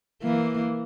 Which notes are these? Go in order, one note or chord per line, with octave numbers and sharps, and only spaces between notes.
E3 A#3